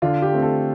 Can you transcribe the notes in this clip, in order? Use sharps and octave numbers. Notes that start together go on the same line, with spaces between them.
D3 F4
G4
A3 C4
A4